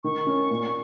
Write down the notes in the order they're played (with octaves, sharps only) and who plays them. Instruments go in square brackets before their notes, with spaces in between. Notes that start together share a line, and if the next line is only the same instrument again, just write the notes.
[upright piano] D#3 [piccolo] C#6
[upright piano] C#4
A#2